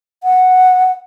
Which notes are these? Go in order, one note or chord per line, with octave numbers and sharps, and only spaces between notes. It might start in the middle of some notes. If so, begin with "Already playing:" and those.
F#5